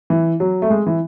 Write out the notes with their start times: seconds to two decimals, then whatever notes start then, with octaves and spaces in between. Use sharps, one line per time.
0.10 E3
0.40 F#3
0.62 A3
0.70 G#3
0.87 E3